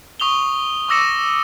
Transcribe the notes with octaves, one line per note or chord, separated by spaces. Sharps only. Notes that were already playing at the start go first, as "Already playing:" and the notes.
C#6 D#6 F7 G7
C#6 D6 E6 A#6 C#7 E7